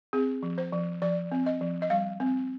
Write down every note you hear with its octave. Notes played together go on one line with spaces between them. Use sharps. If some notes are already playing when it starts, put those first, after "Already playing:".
C4 G#4
F3
C5
F3
F3 D5
C4
D#5
F3
D#5
G3 F5
C4